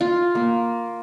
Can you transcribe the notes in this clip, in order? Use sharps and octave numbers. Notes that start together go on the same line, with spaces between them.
F4
A#3